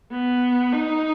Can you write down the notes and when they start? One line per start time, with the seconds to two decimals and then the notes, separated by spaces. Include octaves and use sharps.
0.11 B3
0.73 D#4